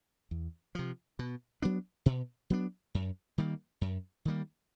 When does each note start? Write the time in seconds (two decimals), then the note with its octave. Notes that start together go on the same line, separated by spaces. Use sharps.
0.31 E2
0.75 C3 F3
1.19 B2
1.62 F#3 B3 D4
2.06 B2
2.50 F#3 B3 D4
2.95 F#2
3.38 D#3 G3 A#3
3.81 F#2
4.25 D#3 G3 A#3